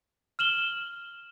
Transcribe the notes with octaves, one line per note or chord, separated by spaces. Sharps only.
F6 E7 F#7 G7